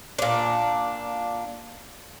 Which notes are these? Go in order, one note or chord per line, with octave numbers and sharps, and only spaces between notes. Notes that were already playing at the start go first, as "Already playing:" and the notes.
A#2 D4